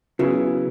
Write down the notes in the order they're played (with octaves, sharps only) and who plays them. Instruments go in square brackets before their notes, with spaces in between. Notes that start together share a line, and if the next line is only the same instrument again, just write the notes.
[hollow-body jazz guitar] C#3 [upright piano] F#3 B3 E4